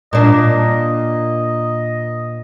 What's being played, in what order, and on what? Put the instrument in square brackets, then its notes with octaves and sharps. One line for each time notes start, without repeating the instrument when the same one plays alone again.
[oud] A#2 D4 [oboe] D#5